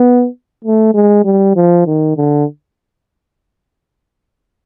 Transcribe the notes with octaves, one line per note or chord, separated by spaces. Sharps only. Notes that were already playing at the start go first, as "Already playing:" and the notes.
Already playing: B3
A3
G#3
G3
F3
D#3
D3